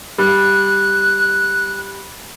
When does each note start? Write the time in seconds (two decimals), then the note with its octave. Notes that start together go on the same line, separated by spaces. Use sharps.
0.18 G3 F#6